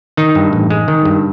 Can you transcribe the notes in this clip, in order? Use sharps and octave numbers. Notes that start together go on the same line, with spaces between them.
D#3 D#4
G2
A1
G#3
D#3
G2